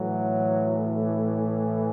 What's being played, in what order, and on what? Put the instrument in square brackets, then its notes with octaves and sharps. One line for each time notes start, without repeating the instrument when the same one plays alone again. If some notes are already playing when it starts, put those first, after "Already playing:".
Already playing: [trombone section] A2 E3 F#3